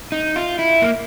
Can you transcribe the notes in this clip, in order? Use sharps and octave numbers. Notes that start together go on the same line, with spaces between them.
D#4
F4
E4
A#3